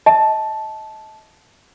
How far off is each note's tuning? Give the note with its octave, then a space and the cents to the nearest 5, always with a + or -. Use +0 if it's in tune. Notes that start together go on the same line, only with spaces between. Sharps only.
D#5 +25 A5 -15